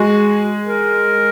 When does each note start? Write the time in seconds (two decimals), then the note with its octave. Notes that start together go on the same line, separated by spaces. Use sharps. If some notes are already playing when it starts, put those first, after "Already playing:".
Already playing: G#3 F#4 G#4
0.65 A#4